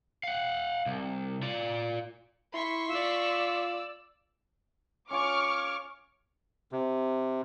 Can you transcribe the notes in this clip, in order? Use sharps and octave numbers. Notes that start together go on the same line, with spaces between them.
F5 F#5
C2
F4 D5
E4 C6 C#6 B6
F4 D5 E6
C#4 F4 C#5 C#6 D6 F6
C3